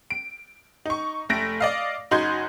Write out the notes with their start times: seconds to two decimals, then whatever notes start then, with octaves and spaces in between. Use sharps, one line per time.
0.11 D7
0.85 D#4 C#6
1.29 F1 A3 A#6 D7
1.60 D5 D#5 F5
2.11 F#1 D#4 F#4 C6 G6 G#6